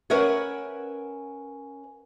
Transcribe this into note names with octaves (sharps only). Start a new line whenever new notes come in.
C#4 A#4 B4 E5 F#5 G#5